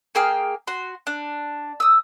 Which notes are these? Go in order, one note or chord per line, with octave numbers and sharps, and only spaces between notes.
A#3 G#4 G5 F6
F#4 C6
D4
D#6 E6